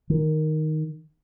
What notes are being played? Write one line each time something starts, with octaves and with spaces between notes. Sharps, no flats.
D#3